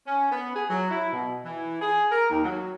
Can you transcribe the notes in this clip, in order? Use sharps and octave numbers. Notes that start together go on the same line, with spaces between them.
C#4
B3
G#4
F#3
E4
B2
E3
G#4
A#4
D#2
F#3